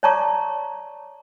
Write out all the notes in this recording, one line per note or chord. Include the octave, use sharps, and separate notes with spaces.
C#5 D5 A5 A#5 C#6 D6